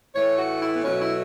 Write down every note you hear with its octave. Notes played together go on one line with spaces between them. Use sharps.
A2 E3 A3 C#5
F#4
E4
B3
B2 F#3 A3 C#4
E4